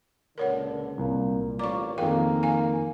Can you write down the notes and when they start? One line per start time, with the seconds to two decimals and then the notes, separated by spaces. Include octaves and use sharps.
0.38 C#2 A#2 D3 A#4 C#5 F#5
0.98 C2 A#2 A#3
1.59 A1 F4 A#4 D5 C#6 D6
1.98 F2 D#3 A#3 G#4 A#4 F5 G5
2.43 F5 G#5